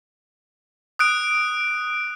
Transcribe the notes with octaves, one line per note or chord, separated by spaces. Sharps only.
D#6 F#6 D7